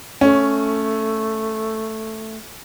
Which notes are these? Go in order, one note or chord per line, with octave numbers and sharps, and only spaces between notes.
A3 C#4